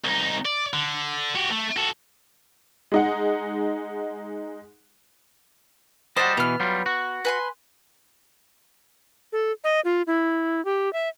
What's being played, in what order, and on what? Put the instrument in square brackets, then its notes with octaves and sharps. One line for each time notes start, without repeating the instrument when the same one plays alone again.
[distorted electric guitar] C2 D#4
D5
D3
F#4 G4
A3
F#4 A4
[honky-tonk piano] G#3 D#4 F#5
[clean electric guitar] G3 D#5 A5 [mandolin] F#4 C5
[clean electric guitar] B2 E3 [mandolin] B3 F6
[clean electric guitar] F#3 G3 F4
F#4
[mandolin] B4 G#5 C6
[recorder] A4
D#5
F4
E4
G4
E5